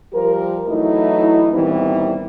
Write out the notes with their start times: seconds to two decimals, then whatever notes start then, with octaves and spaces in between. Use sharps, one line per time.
0.12 F3 G3 G4 A#4
0.67 E3 F#3 A3 D#4 E4
1.51 A#2 D#3 E3 G3 B3 C4